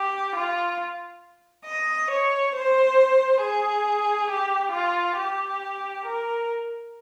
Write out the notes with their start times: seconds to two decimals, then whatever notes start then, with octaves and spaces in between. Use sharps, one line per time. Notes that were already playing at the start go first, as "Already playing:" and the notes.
Already playing: G4
0.35 F4
1.66 D#5
2.11 C#5
2.54 C5
3.41 G#4
4.29 G4
4.72 F4
5.16 G4
6.04 A#4